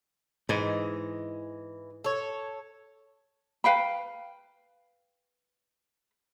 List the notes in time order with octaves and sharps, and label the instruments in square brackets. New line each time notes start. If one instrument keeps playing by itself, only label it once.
[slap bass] G#2 [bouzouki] E3 D#5
[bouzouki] A4 C#5
[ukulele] B4 F5 G5 B5